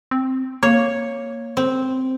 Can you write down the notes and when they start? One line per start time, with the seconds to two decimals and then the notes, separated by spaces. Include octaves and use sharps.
0.11 C4
0.63 A#3 C#5
1.57 C4